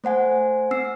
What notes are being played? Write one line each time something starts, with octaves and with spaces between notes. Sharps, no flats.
A3 C5 F#5 G#5
C4 E6 C7